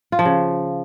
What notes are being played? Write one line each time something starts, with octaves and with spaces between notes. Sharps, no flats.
F4
F3
C#3